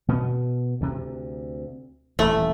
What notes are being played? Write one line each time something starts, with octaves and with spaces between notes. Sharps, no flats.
B2 B3
D2 C3
D#1 A1 E3 A3